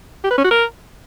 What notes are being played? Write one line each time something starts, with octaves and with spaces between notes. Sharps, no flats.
G4
B4
C#4
F#4
A#4